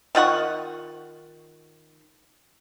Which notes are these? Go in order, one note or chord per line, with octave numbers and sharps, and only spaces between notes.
D#3 F4 F#5 C#6